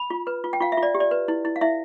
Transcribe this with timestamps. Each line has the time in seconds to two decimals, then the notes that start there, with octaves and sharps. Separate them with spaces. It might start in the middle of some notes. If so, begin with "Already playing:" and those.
Already playing: B5
0.10 F4
0.27 B4
0.44 F4
0.53 G5
0.60 F4 F5
0.72 E5
0.77 F4
0.83 D5
0.95 G4
1.00 D5
1.11 B4
1.28 E4
1.45 E4
1.56 F5
1.61 E4 E5